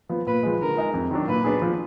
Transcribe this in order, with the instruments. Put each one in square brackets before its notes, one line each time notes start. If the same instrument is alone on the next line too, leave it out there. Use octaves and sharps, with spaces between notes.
[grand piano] F3 B3
[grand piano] A#2 [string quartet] B4
[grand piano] F3 G#3
[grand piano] D3 [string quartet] A#4
[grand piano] G#3 D#4 G#4
F2
D#3 F#3 D4
[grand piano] A#2 [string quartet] B4
[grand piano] F#3 B3 D4 G#4
F3